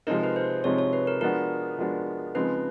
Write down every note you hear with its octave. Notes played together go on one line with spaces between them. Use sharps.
C3 F3 G#3 C4 D#4 A#4
B4
C5
C3 F3 G#3 C4 D#4 C#5
C#5
B4
A#4
F3 G#3 B3 D4 F#4 A#4
F3 G#3 B3 D4 F#4
C#3 F3 G#3 C4 D#4 B4